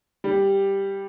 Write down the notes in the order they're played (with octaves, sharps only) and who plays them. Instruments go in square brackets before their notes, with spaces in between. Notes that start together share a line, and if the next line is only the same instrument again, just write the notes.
[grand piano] G3